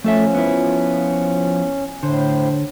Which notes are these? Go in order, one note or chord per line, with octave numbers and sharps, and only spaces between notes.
F3 A3 C#4 A4 E5
B3 E4
A2 D3 C5